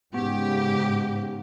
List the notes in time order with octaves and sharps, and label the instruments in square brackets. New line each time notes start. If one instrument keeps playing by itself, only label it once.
[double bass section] G#2 C#3 [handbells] B3 [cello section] G4